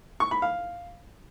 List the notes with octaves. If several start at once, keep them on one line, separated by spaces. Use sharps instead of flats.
C#6
B5
F5